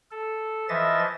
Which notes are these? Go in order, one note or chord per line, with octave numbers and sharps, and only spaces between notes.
A4
E3 F3 D#5 E5 A6